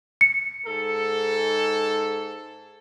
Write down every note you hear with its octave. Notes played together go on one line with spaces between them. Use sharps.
C#7
G#2 A4